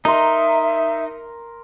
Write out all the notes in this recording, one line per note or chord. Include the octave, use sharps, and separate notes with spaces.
D#4 A#4 E5 C6